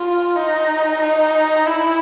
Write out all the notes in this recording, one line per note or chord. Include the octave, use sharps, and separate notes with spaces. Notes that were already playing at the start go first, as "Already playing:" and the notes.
Already playing: F4
D#4
D#4
E4